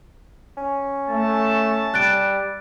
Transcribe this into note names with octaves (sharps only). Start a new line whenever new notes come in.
C#4
A3 A5
G3 F#6 A6 D7